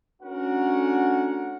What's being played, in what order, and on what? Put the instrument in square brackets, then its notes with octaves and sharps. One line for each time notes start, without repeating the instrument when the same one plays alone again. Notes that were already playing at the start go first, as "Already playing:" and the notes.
[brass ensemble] A3 C#4 D4 F#4 A#4 F#5